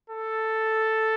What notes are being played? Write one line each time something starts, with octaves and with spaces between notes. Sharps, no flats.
A4